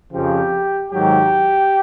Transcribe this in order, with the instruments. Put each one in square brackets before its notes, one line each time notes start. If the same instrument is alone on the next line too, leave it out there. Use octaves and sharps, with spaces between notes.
[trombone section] F2 C#3 F3 G4
G#2 D#3 F#3 G4